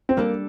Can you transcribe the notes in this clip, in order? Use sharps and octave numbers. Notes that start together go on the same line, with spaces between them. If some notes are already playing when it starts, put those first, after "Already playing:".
C4
G3 A#3 D4 A4 D5